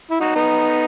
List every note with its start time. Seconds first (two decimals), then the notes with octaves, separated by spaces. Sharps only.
0.11 E4
0.21 D#4 F#4
0.35 B3 D#4